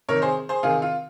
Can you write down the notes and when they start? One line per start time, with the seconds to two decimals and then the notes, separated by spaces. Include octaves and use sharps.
0.09 C3 D#3 A#4 C#5
0.22 G#4 C5
0.49 G#4 C5
0.63 C3 D#3 F4 G#4
0.82 F4